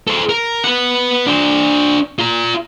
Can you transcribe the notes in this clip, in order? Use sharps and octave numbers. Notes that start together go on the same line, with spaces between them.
A4 C5
A#4
B4 F#5
D4 C5
F4 A#5